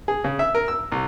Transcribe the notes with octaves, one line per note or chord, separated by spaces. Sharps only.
G#4
C#3
E5
A#4
E6
C2